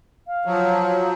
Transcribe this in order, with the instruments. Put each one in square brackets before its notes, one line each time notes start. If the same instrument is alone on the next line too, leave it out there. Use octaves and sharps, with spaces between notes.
[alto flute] F5
[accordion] F3 F#3